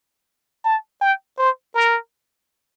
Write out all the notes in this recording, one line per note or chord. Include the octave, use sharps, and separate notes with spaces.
A5
G5
C5
A#4